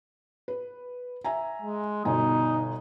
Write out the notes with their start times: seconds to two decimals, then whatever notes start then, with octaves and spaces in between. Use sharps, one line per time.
0.48 B4
1.25 E5 G#5 A#5
1.61 G#3
2.05 G1 B2 D#4 G#5